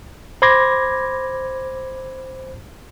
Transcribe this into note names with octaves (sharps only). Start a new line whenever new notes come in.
C5 B5 C6 D6 G#6 A#6